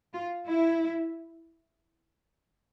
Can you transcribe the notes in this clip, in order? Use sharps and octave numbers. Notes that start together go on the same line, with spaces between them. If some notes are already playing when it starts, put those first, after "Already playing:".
F4
E4